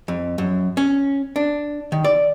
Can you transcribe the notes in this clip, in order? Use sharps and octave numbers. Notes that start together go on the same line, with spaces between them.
F2
F#2
C#4
D4
D#3
D5